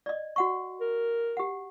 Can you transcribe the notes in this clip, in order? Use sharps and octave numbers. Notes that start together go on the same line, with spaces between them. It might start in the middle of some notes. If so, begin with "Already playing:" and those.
D5 D#5
F#4 F#5 C#6
A#4
G4 F#5